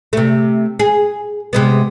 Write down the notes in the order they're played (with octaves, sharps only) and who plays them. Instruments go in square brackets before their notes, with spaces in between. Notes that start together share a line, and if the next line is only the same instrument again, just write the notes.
[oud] C3 A3
G#4
C3 G#3 B3